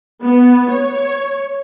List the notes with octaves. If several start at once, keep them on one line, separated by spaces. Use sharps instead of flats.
B3
C#5